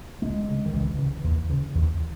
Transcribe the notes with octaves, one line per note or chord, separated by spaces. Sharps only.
C#2 G#3
C#3
D#3
C#2 E3
C#3
D#2
C#3
D#2